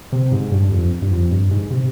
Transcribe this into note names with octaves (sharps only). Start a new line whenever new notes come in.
C3
G#2
G2
F2
G2
F2
G2
G#2
C3